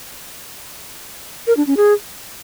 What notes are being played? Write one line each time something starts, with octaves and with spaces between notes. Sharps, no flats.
A#4
D4
C#4
G#4